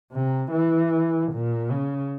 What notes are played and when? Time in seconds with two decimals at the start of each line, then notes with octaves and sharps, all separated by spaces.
0.12 C3
0.51 E3
1.32 A#2
1.71 C#3